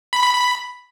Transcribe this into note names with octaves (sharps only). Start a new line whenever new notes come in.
B5
B5
B5